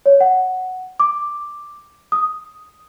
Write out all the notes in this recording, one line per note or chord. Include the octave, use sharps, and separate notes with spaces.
C#5
F#5
D6
D#6